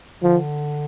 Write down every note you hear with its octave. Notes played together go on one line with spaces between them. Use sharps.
D3 F3